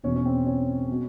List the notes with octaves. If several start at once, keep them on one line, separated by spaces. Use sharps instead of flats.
E1 E2 B2 C#4
C#4
C4
C#4
B2 F#3